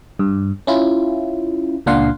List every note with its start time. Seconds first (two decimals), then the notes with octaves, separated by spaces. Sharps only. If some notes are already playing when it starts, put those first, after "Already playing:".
0.19 G2
0.67 C#4 E4 F4
1.86 C#2 A#2 D4 F5 F#5 C6